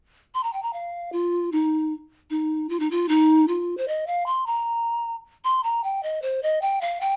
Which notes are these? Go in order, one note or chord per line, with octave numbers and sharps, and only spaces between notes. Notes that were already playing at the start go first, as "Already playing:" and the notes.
C6
A#5
G5
A#5
F5
F4
D#4
D#4
F4
D#4
F4
D#4
F4
C5
D#5
F5
C6
A#5
C6
A#5
G5
D#5
C5
D#5
G5
F5
G5